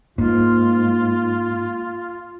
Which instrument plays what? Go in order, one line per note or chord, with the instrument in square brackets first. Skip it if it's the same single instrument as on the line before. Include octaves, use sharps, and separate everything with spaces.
[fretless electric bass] G#2 [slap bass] A#3 [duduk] F4